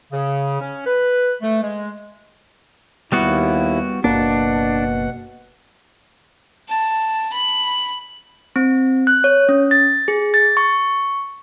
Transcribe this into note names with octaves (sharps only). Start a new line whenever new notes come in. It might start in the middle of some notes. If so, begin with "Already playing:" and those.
C#3
C#4
B4
A3
G#3
D#2 G3 B3 E4 F#4
F#1 B2 A#3 D4 F#5
A5
B5
C4
F#6
C#5
C#4
A6
G#4
A6
C#6